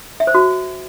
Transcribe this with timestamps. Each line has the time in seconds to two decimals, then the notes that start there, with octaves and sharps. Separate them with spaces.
0.20 E5
0.27 C5
0.34 F#4